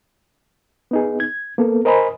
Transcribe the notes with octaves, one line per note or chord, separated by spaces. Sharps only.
B3 D#4 G#4
G#6
A#3 B3 A4
A#4 C5 D#5 G#5 A#5 B5